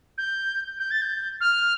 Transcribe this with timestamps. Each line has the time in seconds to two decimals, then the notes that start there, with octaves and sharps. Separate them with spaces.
0.18 G6
0.79 G6
0.91 A6
1.02 G6
1.41 F6